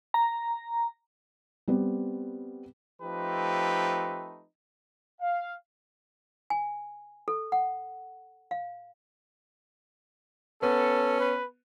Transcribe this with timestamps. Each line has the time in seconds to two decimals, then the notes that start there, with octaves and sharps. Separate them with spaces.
0.14 A#5
1.68 G3 B3 C4
3.02 F3 A3 C4 D#4 G4 B4
5.21 F5
6.50 G#5
7.28 A4
7.52 F#5
8.51 F5
10.62 B3 C#4 A4
11.20 B4